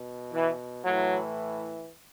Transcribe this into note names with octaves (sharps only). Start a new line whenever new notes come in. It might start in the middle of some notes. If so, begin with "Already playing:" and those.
Already playing: B2
E3
A2 E3 F#3